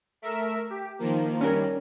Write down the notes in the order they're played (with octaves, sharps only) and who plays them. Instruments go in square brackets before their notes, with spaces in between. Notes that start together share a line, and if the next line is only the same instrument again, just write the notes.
[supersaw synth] A3 A#4 E5
G4
D#3 F3 A#3
[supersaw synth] D#3 G3 [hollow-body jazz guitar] C#4 A#4